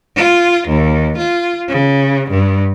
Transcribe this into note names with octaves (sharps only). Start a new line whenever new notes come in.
F4
D#2
F4
C#3
G2